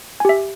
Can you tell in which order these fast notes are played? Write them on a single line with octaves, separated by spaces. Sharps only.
G#5 G4 E5